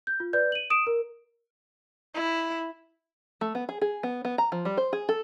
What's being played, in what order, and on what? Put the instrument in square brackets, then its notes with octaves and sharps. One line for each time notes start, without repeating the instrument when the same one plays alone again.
[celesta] G6
F4
B4 D5 G6
D#7 F#7
D#6 D7 E7
A#4
[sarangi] E4
[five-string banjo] A3
B3
G#4
G#4
B3
B3
A#5
F3
G3
C5
G#4
A4